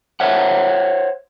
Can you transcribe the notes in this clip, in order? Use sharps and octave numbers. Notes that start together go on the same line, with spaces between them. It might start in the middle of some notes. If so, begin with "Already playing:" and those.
C5 C#5 E5 F#5